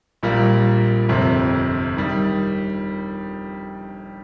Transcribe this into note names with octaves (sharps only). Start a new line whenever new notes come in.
A#1 A#2 G3 A#3
G1 F2 C3
D#3 G3